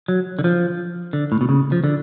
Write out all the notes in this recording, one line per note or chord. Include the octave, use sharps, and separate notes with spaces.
F#3
D3
F3
D3
A2
B2
C#3
F3
D3